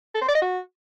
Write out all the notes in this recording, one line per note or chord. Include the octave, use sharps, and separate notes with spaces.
A4
C5
D5
D#5
F#4